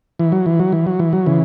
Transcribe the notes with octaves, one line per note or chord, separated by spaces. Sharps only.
E3
F#3
E3
F#3
E3
F#3
E3
F#3
C#3 E3